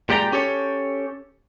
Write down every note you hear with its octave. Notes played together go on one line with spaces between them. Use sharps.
A#2 G#3 G4 D5 G5 A#5
C#4 G4 A4 C#5